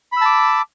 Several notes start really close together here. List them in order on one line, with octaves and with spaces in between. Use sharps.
B5 E6 A5 D6